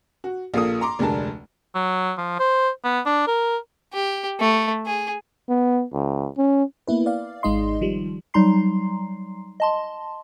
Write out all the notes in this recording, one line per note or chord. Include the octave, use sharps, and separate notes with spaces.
F#4
A#1 A#3 F4 A4 D#6
A#5 C6 D6
F1 D2 G#3 D4 A#4 A5
F#3
F3
C5
B3
D4
A#4
G4
A3
G#4
B3
C#2
C#4
A#3 B3 E4 B4
D5 F5
G#1 G#3 D#4 D#5 C6
D#3 F3 G3
F#3 G3 D#4 A#5 C6 C7
D#5 A5 C6